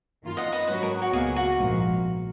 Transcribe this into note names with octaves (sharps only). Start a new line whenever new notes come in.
F#2 D#3 A#3 F4
D#5 F#5
B4 D#5
G#2 F#3 C#4 F#4 B4
A#4
F#4
C#2 B2 A#3 G#4
F#4
A#1 G#2 F3 A#3